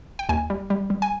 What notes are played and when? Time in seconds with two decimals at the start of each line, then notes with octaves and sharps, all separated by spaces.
0.19 G5
0.29 D#2 G#5
0.50 G3
0.70 G3
0.90 G3
1.02 G#5